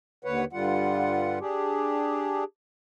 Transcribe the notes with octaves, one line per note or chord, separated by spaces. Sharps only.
D#2 D3 B4 C#5 F#5
G2 D3 G3 F4 F#5
D4 G4 G#4